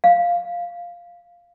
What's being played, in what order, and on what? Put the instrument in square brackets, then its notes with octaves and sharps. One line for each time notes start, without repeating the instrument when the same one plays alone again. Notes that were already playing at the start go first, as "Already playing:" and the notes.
[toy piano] F5